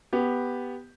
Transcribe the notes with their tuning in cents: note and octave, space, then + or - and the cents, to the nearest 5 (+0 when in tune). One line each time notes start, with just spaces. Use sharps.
B3 +0 G4 +5